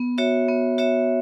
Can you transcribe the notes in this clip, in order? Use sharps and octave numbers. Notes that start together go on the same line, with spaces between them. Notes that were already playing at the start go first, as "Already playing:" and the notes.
Already playing: B3
F#4 C#5 E5
B3
F#4 C#5 E5